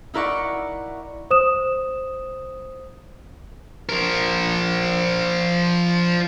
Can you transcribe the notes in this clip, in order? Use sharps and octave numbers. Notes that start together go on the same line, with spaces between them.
D#4 E4 A#4 D5 F#5 C#6
C5 D#6 E7
F3 A#4